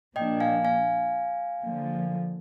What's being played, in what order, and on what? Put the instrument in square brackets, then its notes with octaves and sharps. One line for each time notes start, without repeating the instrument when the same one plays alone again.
[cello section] A#2 F3 A#3 D4 [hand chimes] D#5 G5
[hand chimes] F5 G#5
F5 G#5
[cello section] D3 F3 A#3